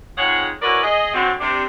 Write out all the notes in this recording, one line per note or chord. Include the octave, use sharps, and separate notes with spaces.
F2 G#2 C#3 G#4 C#5 F#5
C#4 E4 F#4 A#4 B4 D5
G#4 D#5
D3 F#3 C4
C3 D4